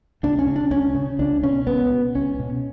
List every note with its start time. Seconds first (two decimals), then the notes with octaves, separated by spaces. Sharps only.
0.23 C#2 D4
0.39 C#4
0.47 C#3
0.56 D4
0.71 C#2 C#4
0.95 C#3
1.19 C#2 D4
1.43 B2 C#4
1.67 C#2 B3
1.90 B2
2.15 C#2 C#4
2.39 B2